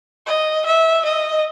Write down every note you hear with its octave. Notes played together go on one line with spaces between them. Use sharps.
D#5
E5
D#5